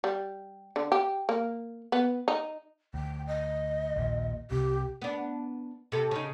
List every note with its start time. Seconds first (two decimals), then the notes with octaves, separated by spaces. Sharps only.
0.04 G3
0.76 D3
0.92 G4
1.29 A#3
1.92 B3
2.28 D#4
2.94 D2 G5
3.27 D#5
3.96 A#1 D#2 A#2
4.51 C2 C3 G4
5.02 B3 D4
5.92 C3 A4
6.11 C#3 D#4